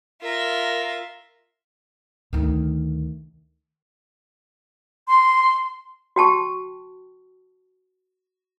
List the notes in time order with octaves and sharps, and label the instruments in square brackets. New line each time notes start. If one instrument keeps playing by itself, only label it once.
[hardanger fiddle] F4 E5 [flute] A#4
[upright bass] D2 D#3
[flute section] C6
[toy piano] F#4 G5 A5 C#6